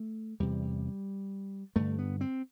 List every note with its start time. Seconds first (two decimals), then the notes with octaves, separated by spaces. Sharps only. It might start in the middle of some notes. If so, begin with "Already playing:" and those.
Already playing: A3
0.40 E2 C3 G3
1.76 G2 D3 A3
1.99 B3
2.21 C4